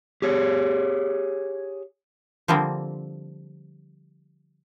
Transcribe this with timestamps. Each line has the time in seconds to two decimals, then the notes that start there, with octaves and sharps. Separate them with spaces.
0.22 G4 G#4 C#5
2.48 D3 F3 G3 A#3 C4